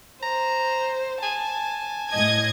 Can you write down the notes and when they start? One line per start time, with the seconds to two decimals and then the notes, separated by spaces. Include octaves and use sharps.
0.23 C5 A#5
1.23 G#5 A5
2.11 A2 D#5 G#6